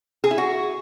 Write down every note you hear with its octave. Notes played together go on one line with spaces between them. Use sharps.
G#4
E4
F#4